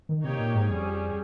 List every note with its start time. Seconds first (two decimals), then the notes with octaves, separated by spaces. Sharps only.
0.09 D#3
0.24 C3 A#3 D#4 G4 C#5
0.39 A#2
0.54 G#2
0.70 F2 G3 C#4 G#4